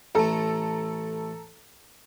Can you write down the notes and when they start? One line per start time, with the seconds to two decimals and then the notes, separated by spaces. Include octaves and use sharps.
0.15 A1 A3 A4 A#5